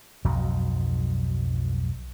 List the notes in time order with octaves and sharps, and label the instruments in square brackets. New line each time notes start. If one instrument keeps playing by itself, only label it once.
[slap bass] B1 F2 G#2 F#3